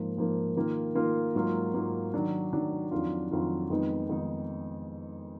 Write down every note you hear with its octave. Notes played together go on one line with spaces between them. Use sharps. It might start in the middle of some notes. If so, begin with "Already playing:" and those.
Already playing: G#2 F3 A#3
G#2 F3 A#3
D#3 A#3 F4 A#4
D#3 A#3 F4 A#4
G#2 F#3 A#3 F4
G#2 F#3 A#3 F4
D#3 F#3 D4
D#3 F#3 D4
F2 D#3 F#3 D4 F4
F2 D#3 F#3 D4 F4
F2 D#3 G#3 B3 D#4
F2 D#3 G#3 B3 D#4